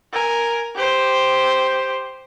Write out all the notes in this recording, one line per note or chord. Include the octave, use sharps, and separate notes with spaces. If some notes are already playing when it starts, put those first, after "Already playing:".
A#4 G#5
G4 C5